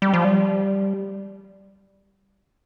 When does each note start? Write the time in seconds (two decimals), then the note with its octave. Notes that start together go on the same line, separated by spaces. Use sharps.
0.02 G3
0.14 F3
0.25 G3